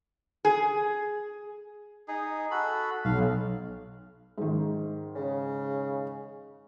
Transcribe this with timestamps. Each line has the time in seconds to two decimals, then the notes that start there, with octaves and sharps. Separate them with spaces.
0.45 G#4
2.08 D#4 G#4
2.51 F#4 A4 B5
3.05 B1 F5
4.38 G#2 D#3
5.15 C#3